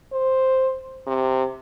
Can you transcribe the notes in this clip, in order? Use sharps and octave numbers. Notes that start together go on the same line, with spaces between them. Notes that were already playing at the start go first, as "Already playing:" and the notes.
C5
C3